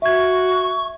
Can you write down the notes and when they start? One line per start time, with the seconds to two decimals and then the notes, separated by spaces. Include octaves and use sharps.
0.02 F#4 E5 C#6 G#6